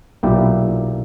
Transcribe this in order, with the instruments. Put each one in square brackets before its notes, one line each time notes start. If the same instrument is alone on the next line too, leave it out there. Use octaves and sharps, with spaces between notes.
[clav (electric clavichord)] B1 A#2 A#3 E4 G4